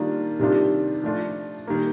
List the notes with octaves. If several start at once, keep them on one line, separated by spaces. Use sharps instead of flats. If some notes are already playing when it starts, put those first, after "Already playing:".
Already playing: D#3 G3 A#3 D4 F4
C3 D#3 G3 D4 F4
F3 A3 D4 F4
D#3 G3 A#3